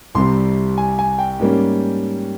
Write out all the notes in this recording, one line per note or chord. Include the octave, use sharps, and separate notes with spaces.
C2 C3 G3 C4 C6
G#5
G#5
G5
G#2 G3 A#3 C#4